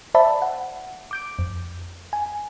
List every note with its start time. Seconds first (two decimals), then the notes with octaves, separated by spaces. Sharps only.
0.15 C5 D5 E5 A5 B5
0.42 F#5
1.11 D6 G6 D7
1.39 F2
2.13 G#5